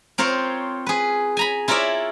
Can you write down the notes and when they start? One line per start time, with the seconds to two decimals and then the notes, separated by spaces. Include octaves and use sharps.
0.18 C4 F4 A#4 C5 C#5
0.86 G#4 B4
1.37 G#5 A#5 B5
1.68 E4 F4 A#4 C#5 D5 E5